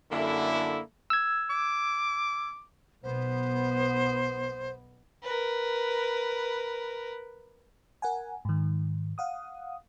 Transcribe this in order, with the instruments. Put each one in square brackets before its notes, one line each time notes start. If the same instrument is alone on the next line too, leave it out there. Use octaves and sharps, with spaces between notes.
[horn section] F#2 D3 A3 A#3 E4
[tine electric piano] E6 G#6
[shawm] D6
[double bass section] B1 B2 B3 [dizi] C5
[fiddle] A#4 B4
[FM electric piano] A#4 F#5 G#5
G#2 D#3
F5 F#5 D#6